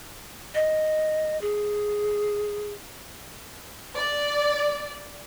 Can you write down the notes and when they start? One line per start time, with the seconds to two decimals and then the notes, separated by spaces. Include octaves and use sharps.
0.55 D#5
1.41 G#4
3.96 D5